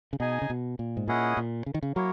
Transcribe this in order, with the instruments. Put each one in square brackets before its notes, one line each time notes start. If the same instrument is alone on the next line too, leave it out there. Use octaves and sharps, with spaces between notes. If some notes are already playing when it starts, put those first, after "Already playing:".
[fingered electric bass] C#3
[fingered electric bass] B2 [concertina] D#4 G#4 D#5 G#5
[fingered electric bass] C#3
B2
A#2
G#2
[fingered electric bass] A#2 [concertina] C#4 E4 G#4 D#5 F#5
[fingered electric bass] A#2
C#3
D#3
C#3
[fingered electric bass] F#3 [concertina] A#3 E4 A#4 C#5